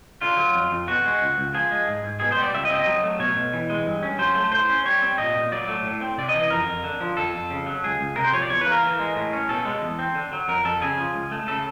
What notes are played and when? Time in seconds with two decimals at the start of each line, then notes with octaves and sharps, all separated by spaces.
0.21 D3 F4
0.38 F#3
0.55 F2
0.71 F2
0.88 B2 F#4
1.05 G#3
1.21 C#2
1.38 C#2
1.54 F3 G#4
1.71 G#3
1.88 G#2
2.04 G#2
2.20 B2 G#4
2.32 G3 C5
2.43 D5
2.54 C#2 E5
2.65 D#5
2.69 C4
2.75 D#5
2.86 F#3
3.04 A3
3.19 B2 C#5
3.36 B2
3.53 E3
3.70 G#3
3.86 G2
4.03 C#4
4.18 F#3 C5
4.35 A3
4.52 A2 C5
4.69 C#4
4.85 G3 C#5
5.02 C4
5.18 A#2 D#5
5.36 A#2
5.52 F#3 D5
5.68 A3
5.84 A2
6.01 C4
6.18 C3 D5
6.29 D#5
6.34 E3
6.40 D#5
6.50 F2 A#4
6.67 F2
6.84 D3
7.01 F3
7.17 F2 A4
7.34 F2
7.50 C#3
7.66 F#3
7.84 C#2 G#4
8.00 C#2
8.16 C3 A#4
8.24 C5
8.33 F3 C#5
8.42 D5
8.50 E2 C#5
8.61 B4
8.66 A#3
8.72 A#4
8.83 E3
8.99 G#3
9.15 A2
9.33 C#4
9.49 B2 A4
9.65 G#3
9.82 E2
9.99 C4
10.15 D3
10.32 F#3
10.48 F2 A#4
10.65 F2 A4
10.81 C#3 G#4
10.98 F3
11.14 C#2
11.32 A3
11.48 C#3 A4